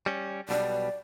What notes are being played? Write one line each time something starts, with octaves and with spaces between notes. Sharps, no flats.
G3 C#4
B1 B2 G3 D5